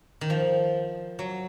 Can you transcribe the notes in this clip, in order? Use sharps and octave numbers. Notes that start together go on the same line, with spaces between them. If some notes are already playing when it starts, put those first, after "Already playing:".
D#3
F3
F#3